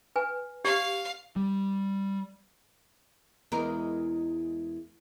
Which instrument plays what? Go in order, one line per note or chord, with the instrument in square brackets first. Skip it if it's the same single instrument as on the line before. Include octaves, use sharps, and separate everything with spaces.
[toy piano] B4 G#5
[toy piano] G4 D5 [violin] F5
[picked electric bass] G3
[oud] E2 G#3 A#4